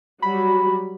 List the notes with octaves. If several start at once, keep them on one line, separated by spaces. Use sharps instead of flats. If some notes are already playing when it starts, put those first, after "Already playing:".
F#3 G3 F#4 B5